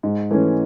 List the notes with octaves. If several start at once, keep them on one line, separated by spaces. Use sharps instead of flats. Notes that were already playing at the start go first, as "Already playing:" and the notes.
G#2
E3 A3 C#4